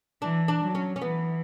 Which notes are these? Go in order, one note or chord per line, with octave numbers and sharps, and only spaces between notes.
E3 D4
D4
F#3
C#4
C#4
E3 B3